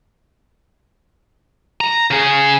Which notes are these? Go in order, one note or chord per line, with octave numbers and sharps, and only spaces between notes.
A#5
C#3 G#4